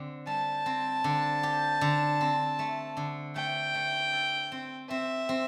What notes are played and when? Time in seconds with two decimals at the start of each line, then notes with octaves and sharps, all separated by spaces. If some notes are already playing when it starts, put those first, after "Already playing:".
Already playing: D3 C4
0.27 G3 A5
0.66 C4
1.04 D3
1.43 G4
1.81 D3
2.21 C4
2.59 A3
2.97 D3
3.36 A3 G5
3.74 A3
4.13 A4
4.52 C4
4.90 C4 E5
5.29 C4